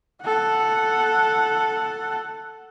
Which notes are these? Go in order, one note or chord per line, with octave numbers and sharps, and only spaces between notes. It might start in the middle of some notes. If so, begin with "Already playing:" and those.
A4 F#5